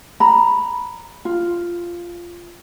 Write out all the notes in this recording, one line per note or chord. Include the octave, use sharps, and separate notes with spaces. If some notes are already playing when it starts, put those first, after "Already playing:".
A#5 B5
F4